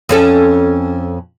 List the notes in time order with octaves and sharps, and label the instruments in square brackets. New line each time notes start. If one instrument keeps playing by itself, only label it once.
[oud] F2 C#4 A4